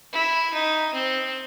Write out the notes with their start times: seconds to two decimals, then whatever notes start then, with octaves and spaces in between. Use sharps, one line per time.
0.13 E4
0.53 D#4
0.93 C4